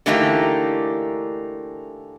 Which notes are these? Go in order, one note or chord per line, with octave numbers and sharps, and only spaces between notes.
D3 E3 A3 A#3 D#4 G4